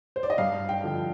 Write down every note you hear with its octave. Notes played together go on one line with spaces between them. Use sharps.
C5
D5
D#5
G2 F5
G5
D3 F3